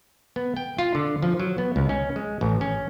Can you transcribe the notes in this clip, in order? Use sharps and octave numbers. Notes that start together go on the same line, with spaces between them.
B3
G5
F4
D3
F3
F#3
B3
C#2
C#4
G#3
A1
C#4